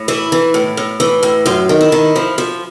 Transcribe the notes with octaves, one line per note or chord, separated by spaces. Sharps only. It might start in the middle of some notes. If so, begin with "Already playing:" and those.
Already playing: A2
E3 E4
E3
A2
A2
E3
A2
F#2 F4
D#3
E4
D#3
F3
F3